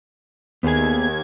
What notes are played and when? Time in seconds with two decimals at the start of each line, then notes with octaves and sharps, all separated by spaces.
0.63 D#2 B3 G#4 G#6